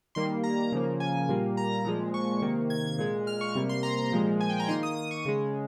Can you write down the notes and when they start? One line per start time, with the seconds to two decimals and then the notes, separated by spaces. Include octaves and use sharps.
0.15 D#3 G3 A#3 C6
0.44 A#5
0.72 C#3 F3 A#3
1.00 G#5
1.29 A#2 G3 A#3
1.57 A#5
1.85 A#2 F3 G#3
2.14 C#6
2.42 C3 D#3 A#3
2.70 G#6
2.98 A#2 G#3
3.27 F6
3.41 C#6
3.55 C3 G3 A#3
3.69 C6
3.83 A#5
4.12 A#2 F3 G#3
4.41 G#5
4.50 G5
4.60 A#5
4.68 D#3 C6
4.71 A#3
4.83 D#6
4.97 D#6
5.11 C#6
5.25 C#3 G#3